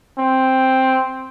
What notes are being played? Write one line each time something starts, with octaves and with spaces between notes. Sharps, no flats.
C4